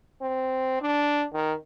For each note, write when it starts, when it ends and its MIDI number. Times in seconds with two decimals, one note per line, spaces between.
0.22 0.78 60
0.81 1.25 62
1.33 1.53 51